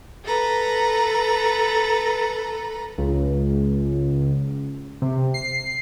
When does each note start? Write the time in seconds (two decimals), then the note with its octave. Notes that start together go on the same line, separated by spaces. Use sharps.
0.24 A4 B4 A#5
2.98 C#2
5.02 C3
5.34 C7